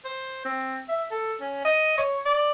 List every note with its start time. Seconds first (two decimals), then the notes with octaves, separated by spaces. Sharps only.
0.04 C5
0.45 C4
0.89 E5
1.11 A4
1.41 C#4
1.65 D#5
1.98 C#5
2.26 D5